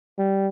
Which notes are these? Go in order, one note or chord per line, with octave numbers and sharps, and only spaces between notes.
G3